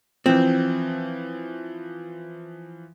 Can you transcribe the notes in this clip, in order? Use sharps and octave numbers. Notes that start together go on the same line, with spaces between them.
E3 F3 C4